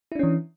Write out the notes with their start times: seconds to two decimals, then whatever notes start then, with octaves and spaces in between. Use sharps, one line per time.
0.12 E4
0.15 D4
0.19 C#4
0.23 E3